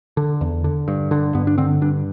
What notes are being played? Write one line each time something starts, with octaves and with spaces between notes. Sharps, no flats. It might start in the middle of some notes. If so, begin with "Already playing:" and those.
D3
E2
D3
G2
D3
G2 B3
D4
D3 C4
G2 D4